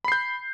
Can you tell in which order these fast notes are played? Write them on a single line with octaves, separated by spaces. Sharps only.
B5 C7 G6